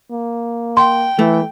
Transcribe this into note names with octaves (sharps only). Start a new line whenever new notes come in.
A#3
G5 C6
E3 A3